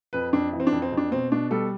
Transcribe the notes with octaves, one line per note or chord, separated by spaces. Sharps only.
F2 B4
F2 D4
E3
C4
D4
F2
C4
F2
D4
B2 C4
B2 D4
G3 A4